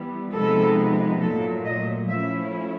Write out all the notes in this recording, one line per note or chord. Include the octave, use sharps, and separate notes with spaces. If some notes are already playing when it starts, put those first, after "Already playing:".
Already playing: E3 G3 B3
C3 F3 G#3 B3 D#4 A4
A#2 F#3 A3 A4
D#5
F3 A3 C#4 E4 E5